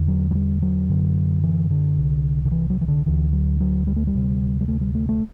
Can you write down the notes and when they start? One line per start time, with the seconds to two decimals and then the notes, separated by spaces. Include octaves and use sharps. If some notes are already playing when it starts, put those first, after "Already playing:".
Already playing: E2 D3
0.08 F#3
0.31 F#3
0.35 G3
0.62 F#3
0.90 F#2 D3
1.43 E3
1.71 D3
1.97 C2 C3
2.45 D3
2.51 E3
2.70 F#3
2.81 E3
2.88 D3
3.06 D2 D3 E3
3.33 F#3
3.60 F#3
3.87 G3
3.96 A3
4.07 G3
4.14 D2 C3
4.61 G3
4.68 A3
4.81 G3
4.95 A3
5.09 A3